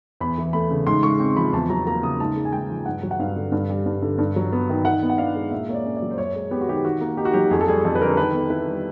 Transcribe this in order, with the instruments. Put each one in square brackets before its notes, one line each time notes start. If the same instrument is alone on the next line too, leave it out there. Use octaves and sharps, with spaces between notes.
[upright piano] E2 B5
E3
A3 B5
C#3
G#2 C6
G#3 C#6
C4
F3 B5
E2 A5
F#3 A#5
A#3 A#5
C#3 D#6
G#2 A5
G#3
G#5
G#2 G5
F3
G2 F#5
F#3
F#5
G2 F5
D3
G2
G3
G2
D3
G2
F#3
B3
D#3
D#3 F#5
B3
F#5
D4 F5
G#3
A#2 E5
A#3 C#5
D5
C#4
D5
F#3
C5
F#2 C#5
G#3
B3 G4
F#4
D#3 G4
D#3 F#4
A#3
D#4 G4
F#4
F#3 G4
F2 G#4
A4
G3 G#4
F2
B4
D3 A#4
D#3 B4
B3
E4 B4
G3